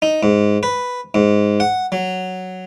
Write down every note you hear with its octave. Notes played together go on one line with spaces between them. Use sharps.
D#4
G#2
B4
G#2
F#5
F#3